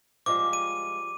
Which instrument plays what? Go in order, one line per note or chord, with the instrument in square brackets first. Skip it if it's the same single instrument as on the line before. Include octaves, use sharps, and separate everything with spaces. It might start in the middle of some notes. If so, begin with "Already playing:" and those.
[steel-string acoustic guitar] F3 G3 G#3 [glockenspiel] D6
[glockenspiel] D#7